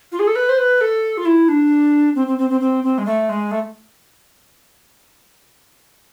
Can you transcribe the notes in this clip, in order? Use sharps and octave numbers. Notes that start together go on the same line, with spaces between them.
F4
G#4
A4
B4
C5
B4
A4
F4
E4
D4
C4
C4
C4
C4
C4
C4
G#3
A3
G#3
A3